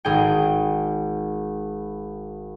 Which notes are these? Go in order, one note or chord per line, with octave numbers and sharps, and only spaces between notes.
G#1 G#4 G5